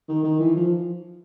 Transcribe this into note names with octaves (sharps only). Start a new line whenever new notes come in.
D#3
D#3
E3
F3